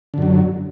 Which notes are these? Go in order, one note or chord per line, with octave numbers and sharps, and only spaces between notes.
F#2 D3 F#3